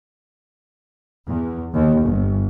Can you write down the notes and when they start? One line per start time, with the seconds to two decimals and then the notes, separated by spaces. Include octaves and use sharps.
1.27 E2
1.74 D#2
2.04 G1